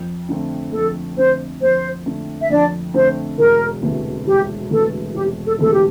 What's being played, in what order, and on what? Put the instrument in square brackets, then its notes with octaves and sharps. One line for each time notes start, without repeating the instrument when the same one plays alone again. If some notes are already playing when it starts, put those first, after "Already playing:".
Already playing: [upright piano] F2
D3 A3 C4
[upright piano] F2 [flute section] A4
[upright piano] D3 A3 C4 [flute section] C5
[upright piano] F2 [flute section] C5
[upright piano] D3 A3 C4
[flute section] E5
[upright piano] F2 [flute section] D4 D5
[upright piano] D3 A3 C4 [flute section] C5
[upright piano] E1 [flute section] A#4
[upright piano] D2 C3 E3 A3
[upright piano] E1 [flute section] G4
[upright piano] D2 C3 E3 A3 [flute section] A4
[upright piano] E1 [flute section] G4
[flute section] A4
[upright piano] D2 C3 E3 A3 [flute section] A4
[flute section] G4